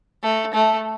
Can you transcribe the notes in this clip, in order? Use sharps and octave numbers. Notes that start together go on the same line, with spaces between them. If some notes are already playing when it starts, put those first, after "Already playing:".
A3
A3